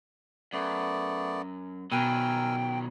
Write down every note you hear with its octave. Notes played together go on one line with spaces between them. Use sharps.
F#2 A3 B3 D5
B2 D#3 F#3 A#4 G5 G#5 E6